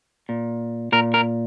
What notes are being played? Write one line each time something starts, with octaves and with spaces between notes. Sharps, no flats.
A#2
A#2 A#4
A#4